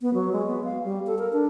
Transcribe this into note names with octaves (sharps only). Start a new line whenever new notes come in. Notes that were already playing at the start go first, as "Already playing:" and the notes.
B3
F#3
G#3
B3
F5
G3
A4
A#4
D4